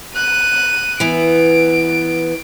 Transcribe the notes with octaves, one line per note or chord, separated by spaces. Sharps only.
F#6 D#7
E3 B3 D7